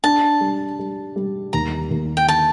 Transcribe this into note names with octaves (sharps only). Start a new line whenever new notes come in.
D4 A5
G3
G3
G3
D#2 A#5
D#2
G5
D3 A5